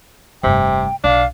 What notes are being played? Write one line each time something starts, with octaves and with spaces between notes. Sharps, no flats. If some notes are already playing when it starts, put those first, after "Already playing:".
F1 G2 C3 G5
B1 D4 F5